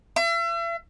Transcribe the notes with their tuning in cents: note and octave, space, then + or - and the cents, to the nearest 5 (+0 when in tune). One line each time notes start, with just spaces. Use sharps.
E5 +40